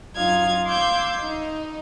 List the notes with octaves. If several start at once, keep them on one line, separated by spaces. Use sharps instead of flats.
F#2 D#4 F4 F5 G#6
F5 C6 D6 E6 G6 G#6
D#4 D#5